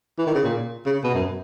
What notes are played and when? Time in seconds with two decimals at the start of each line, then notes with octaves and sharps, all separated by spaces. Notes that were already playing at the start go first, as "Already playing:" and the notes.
0.19 E3
0.27 D#3
0.35 C#3
0.44 A#2
0.86 C#3
1.04 B2
1.14 F#2